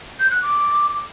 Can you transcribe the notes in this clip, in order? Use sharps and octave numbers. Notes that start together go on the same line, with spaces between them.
G6
F#6
D6